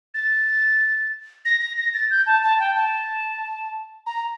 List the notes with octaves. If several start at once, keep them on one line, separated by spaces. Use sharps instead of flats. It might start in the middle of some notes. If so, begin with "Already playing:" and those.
A6
A#6
A#6
A#6
A6
G6
A5
A5
G5
A5
A#5